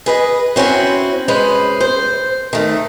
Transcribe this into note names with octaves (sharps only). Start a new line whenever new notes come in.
G#4 B4 D#5
C4 C#4 E4 F#4
G#3 C#4 B4 C5
C5
D#3 A3